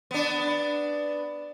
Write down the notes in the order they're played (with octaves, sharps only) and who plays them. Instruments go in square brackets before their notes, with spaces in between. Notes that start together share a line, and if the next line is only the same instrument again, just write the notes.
[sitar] B3 D4